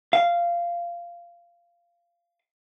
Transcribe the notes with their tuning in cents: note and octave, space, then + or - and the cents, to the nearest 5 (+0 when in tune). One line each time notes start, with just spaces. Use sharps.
F5 -15